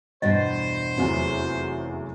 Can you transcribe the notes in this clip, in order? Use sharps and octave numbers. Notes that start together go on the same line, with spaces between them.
E2 G2 B2 C5 D#5
F1 E2 F#3 C#4 F4 F#4